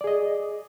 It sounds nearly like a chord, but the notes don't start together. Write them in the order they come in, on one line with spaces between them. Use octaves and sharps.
D5 G#4 D#5